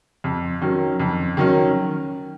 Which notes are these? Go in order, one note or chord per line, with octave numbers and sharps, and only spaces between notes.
F2
D#3 F#3 C#4
F2
D#3 F#3 C#4